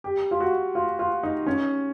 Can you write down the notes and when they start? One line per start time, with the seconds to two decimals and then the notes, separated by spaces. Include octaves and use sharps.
0.04 G4
0.31 F4
0.40 F#4
0.75 F4
0.99 F4
1.23 D#4
1.46 C#4